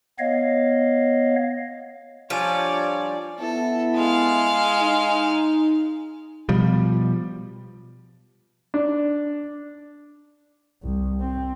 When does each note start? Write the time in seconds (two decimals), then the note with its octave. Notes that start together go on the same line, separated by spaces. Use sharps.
0.19 B3 C#5 D#5 F5
2.30 F3 G3 D4 C#5 D5 G#5 D#7
3.40 B3 E4 A4
3.95 G#3 F5
4.81 D#4
6.49 B2 F3 G3
8.74 D4
10.82 C2
11.21 C4